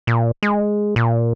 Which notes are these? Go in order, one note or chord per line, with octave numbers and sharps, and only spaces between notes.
A#2
G#3
A#2